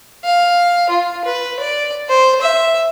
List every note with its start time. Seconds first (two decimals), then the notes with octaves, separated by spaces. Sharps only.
0.25 F5
0.89 F4
1.25 B4
1.60 D5
2.09 C5
2.42 E5